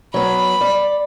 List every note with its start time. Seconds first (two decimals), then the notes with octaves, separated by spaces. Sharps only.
0.14 F#3 B3 B5
0.61 D5